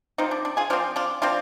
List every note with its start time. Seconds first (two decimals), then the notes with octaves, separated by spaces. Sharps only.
0.18 F3 C4 D#4
0.31 D4
0.45 D4
0.57 F4 G#4
0.70 F3 C4 D4 F4
0.96 D4 F4
1.22 F3 C4 D4 F4